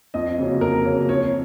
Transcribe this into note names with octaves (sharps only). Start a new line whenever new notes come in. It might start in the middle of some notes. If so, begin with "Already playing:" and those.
F2 D#5
C#3 F#3 A#3 C#4
F2 A#4
C#3 F#3 A#3 C#4
F2 C#5